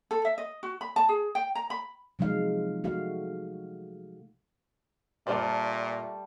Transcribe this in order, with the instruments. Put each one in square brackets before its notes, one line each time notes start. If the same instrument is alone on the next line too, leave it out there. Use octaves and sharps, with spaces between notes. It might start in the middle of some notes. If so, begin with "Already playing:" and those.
[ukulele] A4
E5
D#5
F#4
B5
A5
G#4
G5
A#5
B5
[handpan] C3 F3 F#3 G#3 D#4 F5
A3 F#4 F5
[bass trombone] A#2 [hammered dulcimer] G3 A5 [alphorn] A3 [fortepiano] F4 C5 D5